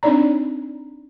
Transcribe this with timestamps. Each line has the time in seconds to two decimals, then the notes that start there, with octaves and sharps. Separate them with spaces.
0.03 C4 D4 D#4 C#5 D5 A#5